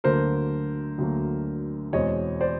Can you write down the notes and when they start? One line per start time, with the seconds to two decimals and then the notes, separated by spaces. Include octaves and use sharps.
0.04 D2 D3 F#3 A#3 A#4 C5
0.98 D2 D3 F#3 A#3
1.93 E2 B2 G#3 C4 C#5 D#5
2.41 C5 D5